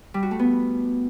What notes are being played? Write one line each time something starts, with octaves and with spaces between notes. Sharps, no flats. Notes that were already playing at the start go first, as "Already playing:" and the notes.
G3
F#4
A3
B3